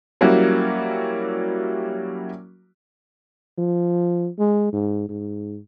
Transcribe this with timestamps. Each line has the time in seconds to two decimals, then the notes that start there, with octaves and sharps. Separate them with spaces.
0.21 F#3 G3 A#3 C#4 E4 F#4
3.58 F3
4.39 G#3
4.73 G#2
5.09 G#2